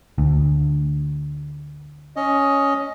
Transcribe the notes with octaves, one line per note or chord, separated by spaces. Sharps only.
D2
C#4 D#5